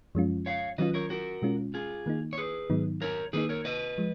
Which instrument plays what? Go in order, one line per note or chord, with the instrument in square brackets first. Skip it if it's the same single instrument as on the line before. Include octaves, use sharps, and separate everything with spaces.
[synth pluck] F#2 F3 G#3 C#4 F4
[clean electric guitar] C#5 F5
[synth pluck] D#3 F#3 C#4 F4 [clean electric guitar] B4 D#5
[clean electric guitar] A#4 C#5
F#4 A#4
[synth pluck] B2 G#3 C#4 F4
[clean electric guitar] F4 G#4
[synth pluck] D#3 A#3 D#4
[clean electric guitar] C#5
G#4 B4
[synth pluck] G#2 D#3 F#3 B3 D#4
[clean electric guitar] A#4 C#5
[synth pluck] D#3 A#3 D#4 [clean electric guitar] G#4 B4
[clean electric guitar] A#4 C#5
B4 D#5
[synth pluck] F3 G#3